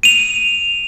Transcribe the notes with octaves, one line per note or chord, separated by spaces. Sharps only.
D#7 F7